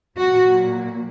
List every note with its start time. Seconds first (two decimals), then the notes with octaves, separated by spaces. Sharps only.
0.18 A#2 F#3 F#4